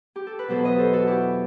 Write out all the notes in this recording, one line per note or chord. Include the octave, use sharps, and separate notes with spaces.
G4
A4
B4
E2 B2 F#3 A4 C5
B4 D#5
A4 C5
F#4 A4
E4 G4